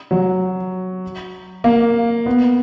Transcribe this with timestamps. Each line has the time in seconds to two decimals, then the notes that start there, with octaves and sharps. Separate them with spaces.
0.11 F#3
1.64 A#3
2.26 B3